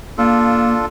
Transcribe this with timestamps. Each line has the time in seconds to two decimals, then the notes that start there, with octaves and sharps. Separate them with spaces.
0.18 A#3 D4 F4 A4